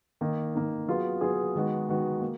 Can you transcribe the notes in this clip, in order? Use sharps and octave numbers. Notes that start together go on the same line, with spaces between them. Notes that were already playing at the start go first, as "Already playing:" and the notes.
D#3 A#3 D#4
D#3 A#3 D#4
F#3 B3 F4 G#4
F#3 B3 F4 G#4
D#3 G#3 B3 F#4
D#3 G#3 B3 F#4
A#3